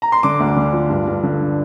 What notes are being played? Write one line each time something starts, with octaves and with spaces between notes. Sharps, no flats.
A#5
C6
D3 D6
D2
D3
F3
G2
G2
D3